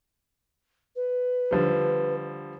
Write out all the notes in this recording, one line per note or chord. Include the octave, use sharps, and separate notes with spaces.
B4
D3 F3 G3